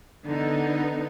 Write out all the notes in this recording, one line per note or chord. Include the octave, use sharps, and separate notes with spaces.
D3 B3 D#4